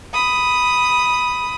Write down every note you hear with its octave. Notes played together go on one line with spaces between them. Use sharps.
B5 D#6